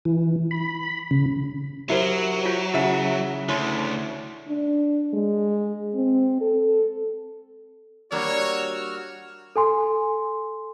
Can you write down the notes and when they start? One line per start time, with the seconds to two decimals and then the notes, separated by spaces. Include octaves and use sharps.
0.05 E3
0.51 B5
1.11 C#3
1.90 F#3 E4 G4 A#4 C5
2.46 F4 F#4
2.74 C#3 E4 E5 F#5
3.49 D2 E4 C#5 C6
4.48 D4
5.14 G#3
5.94 C4
6.41 A4
8.12 G3 A#3 D4 F#4 C#5 E6 F6
9.56 A4 G#5 C6